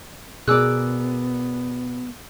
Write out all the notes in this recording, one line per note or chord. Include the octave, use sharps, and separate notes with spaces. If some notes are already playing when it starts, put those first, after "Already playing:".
B2 B3 G#4 A#4 D5 D6 E6 F#6